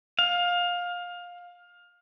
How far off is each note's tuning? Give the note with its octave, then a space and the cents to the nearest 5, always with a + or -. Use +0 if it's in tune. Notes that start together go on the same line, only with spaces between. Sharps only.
F5 +20